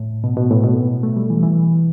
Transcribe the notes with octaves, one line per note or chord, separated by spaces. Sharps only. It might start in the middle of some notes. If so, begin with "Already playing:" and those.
Already playing: A2
B2
B2
A2
B2
A3
G3
E3
E3